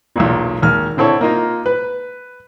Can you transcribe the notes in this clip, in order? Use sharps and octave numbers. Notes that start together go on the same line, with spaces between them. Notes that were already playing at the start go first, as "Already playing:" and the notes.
B1 E2 A#2
G#1 D#2 F6
D3 C4 E4 A4 C#5
A#3 D#4 F4
B4